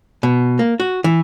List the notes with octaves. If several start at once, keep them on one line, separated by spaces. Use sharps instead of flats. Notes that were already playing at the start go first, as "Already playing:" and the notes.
B2
A#3
F#4
E3